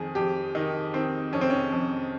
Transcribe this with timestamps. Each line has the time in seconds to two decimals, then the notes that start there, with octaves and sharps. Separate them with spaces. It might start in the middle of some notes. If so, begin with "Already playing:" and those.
Already playing: F2 D#3 G#4
0.15 F2 G4
0.55 D#3 D#4
0.93 D#3 C4
1.32 F2 C#4
1.41 C4
1.50 C#4
1.72 F2